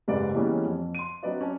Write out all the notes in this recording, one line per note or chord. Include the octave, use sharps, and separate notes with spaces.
F#1 G#2 G3 A#4 B4 D5
E3 G3 G#3 A#3 B3 C#4
F2
C6 D#7
F#3 C4 D4 B4 D5 D#5
C#4 C#5 A5